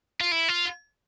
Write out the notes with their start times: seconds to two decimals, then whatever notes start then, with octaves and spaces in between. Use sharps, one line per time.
0.20 F4
0.31 E4
0.48 F4